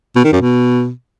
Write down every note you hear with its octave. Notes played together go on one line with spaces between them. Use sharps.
B2
D#3
F#2
B2